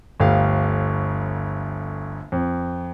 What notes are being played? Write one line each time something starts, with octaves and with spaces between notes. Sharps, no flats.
G1 D2 G4 F5
F2